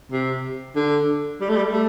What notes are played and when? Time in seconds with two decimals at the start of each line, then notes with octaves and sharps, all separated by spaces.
0.12 C3
0.76 D3
1.41 G3
1.49 A3
1.56 G3
1.73 A3